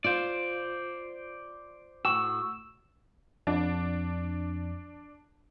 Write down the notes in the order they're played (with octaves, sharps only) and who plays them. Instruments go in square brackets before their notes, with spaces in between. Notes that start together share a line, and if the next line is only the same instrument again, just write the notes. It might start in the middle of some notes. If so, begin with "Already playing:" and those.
[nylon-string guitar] F4 [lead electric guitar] C5 D5
[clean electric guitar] A2 F#4 [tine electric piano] E6
[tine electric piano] F2 [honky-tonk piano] D4